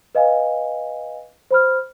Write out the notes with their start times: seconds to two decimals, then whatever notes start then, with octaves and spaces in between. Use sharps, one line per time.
0.15 B4 D#5 F5 G#5
1.51 C5 B5 F6